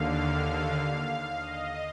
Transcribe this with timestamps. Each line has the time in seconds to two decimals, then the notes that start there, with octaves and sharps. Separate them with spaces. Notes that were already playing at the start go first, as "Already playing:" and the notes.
Already playing: D#2 D3 F5
1.32 D#5